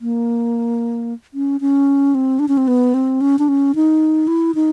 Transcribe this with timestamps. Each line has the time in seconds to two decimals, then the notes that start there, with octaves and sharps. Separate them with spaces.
0.01 A#3
1.34 C#4
1.61 C#4
2.15 C4
2.39 D4
2.48 C#4
2.57 C4
2.68 B3
2.94 C4
3.21 C#4
3.39 D4
3.48 C#4
3.75 D#4
4.27 E4
4.55 D#4